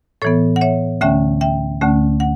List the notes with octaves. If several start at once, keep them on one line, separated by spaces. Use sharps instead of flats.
A2 E3 B3 A4 C#5
F#5
C#5 E5
D2 D3 A3 C#4 E5 G5
E5 G5
D2 D3 A3 C#4
F#5